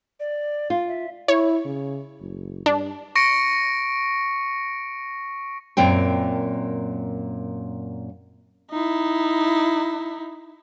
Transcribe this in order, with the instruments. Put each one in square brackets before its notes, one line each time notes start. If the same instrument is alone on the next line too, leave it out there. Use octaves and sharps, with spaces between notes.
[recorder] D5
[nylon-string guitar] F4
[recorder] E5
[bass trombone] E4 [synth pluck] C#5
[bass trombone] C#3
F#1
[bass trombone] G2 [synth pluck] D4
[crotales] C#6 A#6 C#7 D7
[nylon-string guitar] F#2 A#2 C4 G5
[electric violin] D#4 E4